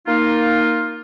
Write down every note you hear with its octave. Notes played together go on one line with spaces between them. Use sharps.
A#3 D#4 F4